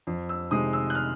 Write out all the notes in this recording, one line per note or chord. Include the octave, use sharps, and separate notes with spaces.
F2
E6
C3 D#3 G#3 D#6
E6
F#6
F6